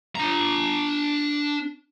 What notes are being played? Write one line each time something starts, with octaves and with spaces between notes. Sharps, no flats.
D4 A#5